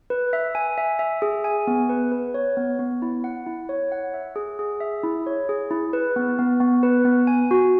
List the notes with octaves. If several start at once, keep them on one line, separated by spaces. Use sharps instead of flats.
B4
E5
G#5
E5
E5
G#4
G#5
B3
B4
B4
C#5
B3
B3
E4
F#5
E4
C#5
F#5
E5
G#4
G#4
E5
E4
C#5
G#4
E4
B4
B3
B3
B3
B4
B3
G#5
F#4